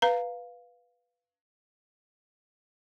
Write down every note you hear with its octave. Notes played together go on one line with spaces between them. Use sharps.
B4 F5 A#5